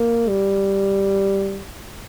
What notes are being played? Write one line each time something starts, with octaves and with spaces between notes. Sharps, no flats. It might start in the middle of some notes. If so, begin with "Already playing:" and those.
Already playing: A#3
G3